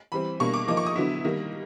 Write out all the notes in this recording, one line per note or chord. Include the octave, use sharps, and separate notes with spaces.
E3 G3 C4 B5
B2 G3 A#3 D4 C#6
D6
F3 A#3 D#4 D6
C#6
D#6
D3 F#3 B3 E4
D#3 G3 A#3